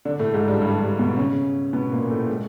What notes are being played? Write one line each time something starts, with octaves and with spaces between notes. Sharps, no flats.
D3 D4
A2 A3
G#2 G#3
G2 G3
G2 G3
G2 G3
B2 B3
C#3 C#4
B2 B3
A#2 A#3
A2 A3
G#3